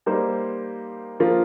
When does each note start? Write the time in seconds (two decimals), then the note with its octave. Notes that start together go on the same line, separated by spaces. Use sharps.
0.06 G3 A#3 D#4 C5
1.20 F3 A#3 F4 A#4